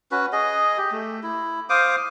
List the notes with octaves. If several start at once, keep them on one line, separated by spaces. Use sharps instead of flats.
C#4 F#4 B4
G#4 D#5
G4
A3
E4
C5 F5 D6 D#6